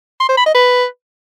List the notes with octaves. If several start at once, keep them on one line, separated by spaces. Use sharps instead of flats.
C6
C5
B5
D#5
B4